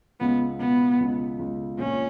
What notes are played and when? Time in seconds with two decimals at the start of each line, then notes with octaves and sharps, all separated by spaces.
0.20 C#2 B3
0.60 B2 B3
1.00 C#2
1.39 C#2
1.78 A#1 C#4